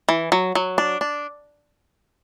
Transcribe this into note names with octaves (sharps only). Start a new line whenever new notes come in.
E3
F#3
F#3
D4
D4